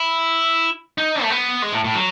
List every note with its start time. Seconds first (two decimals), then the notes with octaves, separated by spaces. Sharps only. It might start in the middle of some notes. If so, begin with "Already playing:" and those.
Already playing: E4
0.98 D#4
1.22 A3
1.30 B3
1.62 G#3
1.74 A2
1.84 A2
1.95 F#3